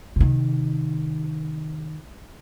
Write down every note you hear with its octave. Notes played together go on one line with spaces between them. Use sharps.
C3 D#3